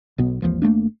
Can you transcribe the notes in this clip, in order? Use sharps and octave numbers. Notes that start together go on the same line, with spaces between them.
B1 B2 B3
G#1 D#2 E3 F3
G#1 A3 A#3 D4